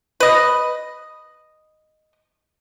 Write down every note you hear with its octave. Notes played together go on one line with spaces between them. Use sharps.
B4 D#5